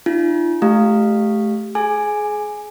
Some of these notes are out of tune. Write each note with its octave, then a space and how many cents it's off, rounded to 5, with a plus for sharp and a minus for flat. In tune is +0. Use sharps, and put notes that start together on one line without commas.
D4 +40 F4 -45
A3 -30 G4 +0 F5 +0
G#4 +25 G#5 +0